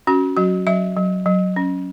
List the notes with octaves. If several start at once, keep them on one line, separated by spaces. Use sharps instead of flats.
C#4 F#4
F#3 F#4
F#3 E5
F#3
F#3
C#4